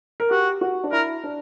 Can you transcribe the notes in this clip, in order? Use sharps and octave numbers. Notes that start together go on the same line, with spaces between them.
A#4
F#4 G4
F#4
D4
E4 A#4
D4